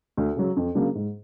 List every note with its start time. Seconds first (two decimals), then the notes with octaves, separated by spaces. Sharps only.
0.17 D2
0.36 C#3 F#3
0.57 F2
0.75 C#3 F#3 A#3 D4
0.95 G#2